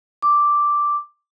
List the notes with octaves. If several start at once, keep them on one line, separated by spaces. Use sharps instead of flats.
D6